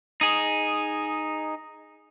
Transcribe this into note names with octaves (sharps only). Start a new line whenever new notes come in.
D#4 G#4